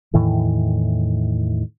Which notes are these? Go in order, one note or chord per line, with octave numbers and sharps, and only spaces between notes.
E2 A2 D#3 E3